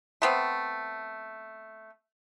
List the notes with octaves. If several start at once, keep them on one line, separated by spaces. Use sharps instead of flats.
A3 B3 C4